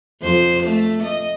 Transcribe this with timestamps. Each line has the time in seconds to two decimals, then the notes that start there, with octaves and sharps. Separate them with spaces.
0.21 F2 C5
0.63 A3
1.03 D#5